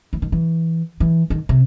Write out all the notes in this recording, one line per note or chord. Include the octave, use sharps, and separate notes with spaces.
E3
D#3
E3
E3
D#3
C3